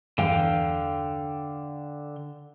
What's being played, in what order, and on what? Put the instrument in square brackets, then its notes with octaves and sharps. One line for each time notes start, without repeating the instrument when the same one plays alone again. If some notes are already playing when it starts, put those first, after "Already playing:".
[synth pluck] E2 G2 E3 [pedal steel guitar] D3 F5 G5